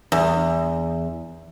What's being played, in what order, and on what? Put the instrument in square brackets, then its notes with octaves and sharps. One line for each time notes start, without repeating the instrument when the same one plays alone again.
[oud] E2